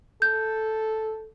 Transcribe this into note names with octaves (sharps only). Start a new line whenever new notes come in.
A4 G6